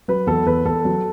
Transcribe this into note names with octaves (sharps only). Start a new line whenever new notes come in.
F#3 B4
E2 A4
E2 B4
E2 A4
F#3